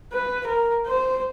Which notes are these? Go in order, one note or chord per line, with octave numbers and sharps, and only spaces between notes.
B4
A#4
C5